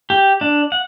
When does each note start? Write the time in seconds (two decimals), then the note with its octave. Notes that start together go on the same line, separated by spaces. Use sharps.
0.10 G4
0.41 D4
0.72 F#5